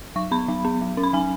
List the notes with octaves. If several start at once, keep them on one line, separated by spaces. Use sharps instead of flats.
F#3 C#6
B3 B5
F#3
B3
F#3
C#4
B5
F#3 G#5